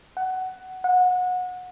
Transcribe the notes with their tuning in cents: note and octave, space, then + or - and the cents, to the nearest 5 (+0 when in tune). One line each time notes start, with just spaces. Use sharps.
F#5 +15
F#5 -25